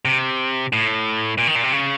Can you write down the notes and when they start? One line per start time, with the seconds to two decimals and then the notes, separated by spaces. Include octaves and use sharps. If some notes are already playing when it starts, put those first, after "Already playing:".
0.05 C3
0.73 A2
1.38 A#2
1.47 D#3
1.55 A#2
1.63 C3
1.72 C#3